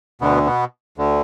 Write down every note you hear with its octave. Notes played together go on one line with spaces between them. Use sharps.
D2 B2 D3 B3
B2 B3
D2 D3